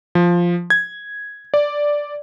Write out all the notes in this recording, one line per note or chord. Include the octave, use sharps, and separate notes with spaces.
F3
G#6
D5